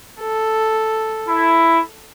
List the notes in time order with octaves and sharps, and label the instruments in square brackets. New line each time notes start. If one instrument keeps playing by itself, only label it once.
[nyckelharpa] A4
[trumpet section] E4